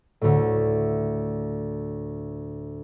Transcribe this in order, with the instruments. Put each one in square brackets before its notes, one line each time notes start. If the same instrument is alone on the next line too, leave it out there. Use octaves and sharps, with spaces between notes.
[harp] D2 A2